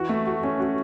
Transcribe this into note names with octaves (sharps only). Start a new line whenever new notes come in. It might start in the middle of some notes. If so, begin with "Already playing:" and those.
Already playing: E3 F#4
A3
F#4
C#4
F#4